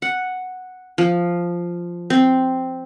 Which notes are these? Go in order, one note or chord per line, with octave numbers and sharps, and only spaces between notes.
F#5
F3
C4